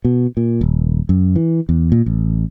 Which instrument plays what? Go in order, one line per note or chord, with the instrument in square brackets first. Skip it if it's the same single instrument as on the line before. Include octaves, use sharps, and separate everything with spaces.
[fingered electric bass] B2
A#2
D#1
F#2
E3
E2
A#2
A1